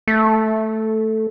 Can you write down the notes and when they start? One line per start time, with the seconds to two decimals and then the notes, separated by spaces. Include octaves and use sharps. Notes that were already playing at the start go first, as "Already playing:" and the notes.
0.07 A3